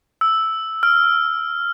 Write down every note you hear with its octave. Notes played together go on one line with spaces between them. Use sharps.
E6
F6